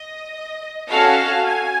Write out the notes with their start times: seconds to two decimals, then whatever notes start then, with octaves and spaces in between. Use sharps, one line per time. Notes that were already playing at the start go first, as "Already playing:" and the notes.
Already playing: D#5
0.90 C#4 F#4 A4 F5
1.45 G#5